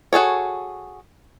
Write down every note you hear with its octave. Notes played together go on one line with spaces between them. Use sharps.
F#4 G#4 A4 C#5